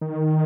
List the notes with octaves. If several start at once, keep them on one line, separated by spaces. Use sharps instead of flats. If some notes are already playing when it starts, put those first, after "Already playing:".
D#3